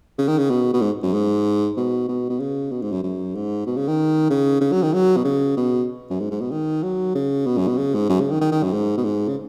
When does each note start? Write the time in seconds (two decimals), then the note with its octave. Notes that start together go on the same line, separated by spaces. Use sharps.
0.19 C#3
0.28 D#3
0.38 C#3
0.50 B2
0.74 B2
0.82 G#2
1.03 F#2
1.14 G#2
1.77 B2
2.08 B2
2.30 B2
2.40 C#3
2.72 B2
2.82 G#2
2.92 F#2
3.04 F#2
3.35 G#2
3.67 B2
3.77 C#3
3.88 D#3
4.30 C#3
4.61 C#3
4.72 F#3
4.83 D#3
4.94 F#3
5.17 B2
5.25 C#3
5.57 B2
6.10 F#2
6.20 G#2
6.31 G#2
6.41 B2
6.51 D#3
6.83 F#3
7.15 C#3
7.47 B2
7.58 F#2
7.68 B2
7.78 C#3
7.94 G#2
8.10 F#2
8.20 C#3
8.31 D#3
8.42 D#3
8.52 D#3
8.63 F#2
8.73 G#2
8.97 B2
9.05 G#2
9.28 C#3